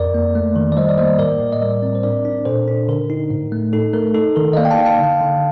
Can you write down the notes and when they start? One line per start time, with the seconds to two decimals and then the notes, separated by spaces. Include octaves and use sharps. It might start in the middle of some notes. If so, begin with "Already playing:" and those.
Already playing: F2 A#4 D5
0.14 A#3
0.35 A3
0.56 D#3
0.72 D5
0.77 G3 C5 D#5
0.89 D5
0.98 A#3 C5 D#5
1.19 A2 A#4 D5
1.40 A2
1.52 D#5
1.61 G3 A#4 D5
1.83 C4
1.95 C5
2.03 D4 A#4 D5
2.25 D4
2.45 A#2 A4 C5
2.68 D4
2.88 D3 A#4
3.10 D#4
3.31 A2
3.52 A3
3.73 D#4 A4
3.93 A3 A#4
4.14 D#4 A4
4.36 D#3 A#4
4.53 D#5
4.57 A#3 D5 F5
4.65 G5
4.71 F5 A5
4.78 D#4
4.85 F5 A5
4.99 D3
5.21 D3